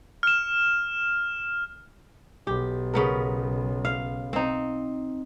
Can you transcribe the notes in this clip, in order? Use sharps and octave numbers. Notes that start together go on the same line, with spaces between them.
F6 E7
B1 G4
C#3 B3 A#4
F5
C4 D#4